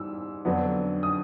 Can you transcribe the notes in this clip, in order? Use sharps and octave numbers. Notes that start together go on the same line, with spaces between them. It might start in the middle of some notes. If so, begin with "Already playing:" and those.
Already playing: G#2 E3 G3 E6
F2 D3 F#3 B3 D4
D#6